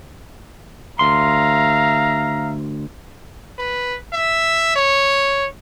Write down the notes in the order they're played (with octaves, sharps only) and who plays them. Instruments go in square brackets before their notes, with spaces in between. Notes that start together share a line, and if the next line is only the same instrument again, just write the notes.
[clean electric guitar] D2 C6 [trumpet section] E5 F5 A#5
[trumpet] B4
E5
C#5